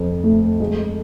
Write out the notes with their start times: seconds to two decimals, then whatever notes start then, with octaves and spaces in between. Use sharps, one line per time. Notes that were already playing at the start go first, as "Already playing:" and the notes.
Already playing: F2
0.24 A3
0.60 G#3